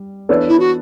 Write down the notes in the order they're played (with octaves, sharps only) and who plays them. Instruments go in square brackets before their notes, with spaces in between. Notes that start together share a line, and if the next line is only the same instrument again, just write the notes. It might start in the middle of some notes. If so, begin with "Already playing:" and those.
Already playing: [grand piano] G3
E3 B3 D4 A4 C#5
[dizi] E4
F#4